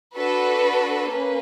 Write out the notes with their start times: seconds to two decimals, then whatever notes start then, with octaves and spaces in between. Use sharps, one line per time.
0.16 D4 F#4 A4 B4
1.09 A#3 C#4 B4